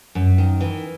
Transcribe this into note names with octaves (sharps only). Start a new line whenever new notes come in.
F#2
D#3
E3